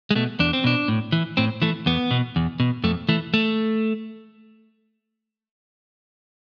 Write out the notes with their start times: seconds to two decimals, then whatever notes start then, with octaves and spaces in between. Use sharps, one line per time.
0.11 G#3
0.15 B2 A3
0.40 E2 D4
0.53 C4
0.64 B2 D4
0.88 A2
1.12 E3
1.37 A2 C4
1.62 E3 A3
1.86 E2 B3
2.11 B2
2.36 E2
2.60 B2
2.84 F2 A3
3.09 E3 A3
3.34 A3